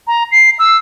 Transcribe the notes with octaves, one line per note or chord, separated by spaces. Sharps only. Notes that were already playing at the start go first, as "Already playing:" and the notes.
A#5
C7
E6